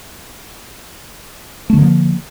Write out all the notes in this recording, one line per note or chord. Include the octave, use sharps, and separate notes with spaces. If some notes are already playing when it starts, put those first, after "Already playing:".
D3 F3 A3 A#3